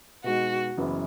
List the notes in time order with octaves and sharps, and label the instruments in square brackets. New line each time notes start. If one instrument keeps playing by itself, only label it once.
[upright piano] B2 G#3 D#4 [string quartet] F#4
[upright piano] F#1 F#2 E3 B3